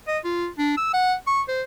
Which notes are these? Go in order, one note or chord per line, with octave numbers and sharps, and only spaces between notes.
D#5
F4
D4
E6
F#5
C#6
C5